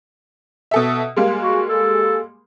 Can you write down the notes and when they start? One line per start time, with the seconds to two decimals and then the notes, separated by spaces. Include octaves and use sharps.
0.71 B2 A4 E5
1.16 G3 G#3 A#3
1.43 F#4
1.69 A4